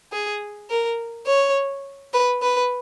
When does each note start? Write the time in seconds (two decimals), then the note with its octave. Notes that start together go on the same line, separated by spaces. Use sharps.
0.12 G#4
0.70 A#4
1.26 C#5
2.14 B4
2.42 B4